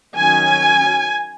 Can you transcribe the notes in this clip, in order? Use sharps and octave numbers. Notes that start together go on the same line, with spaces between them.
D#3 F#3 C#4 G#5